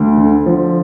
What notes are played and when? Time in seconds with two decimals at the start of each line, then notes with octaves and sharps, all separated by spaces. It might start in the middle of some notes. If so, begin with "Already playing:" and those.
Already playing: D2
0.17 D3
0.46 F3